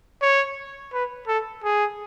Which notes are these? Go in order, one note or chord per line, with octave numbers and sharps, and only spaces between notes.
C#5
B4
A4
G#4